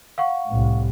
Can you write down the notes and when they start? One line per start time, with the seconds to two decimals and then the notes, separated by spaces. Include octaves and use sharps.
0.18 F5 F#5 C#6
0.47 C2 A2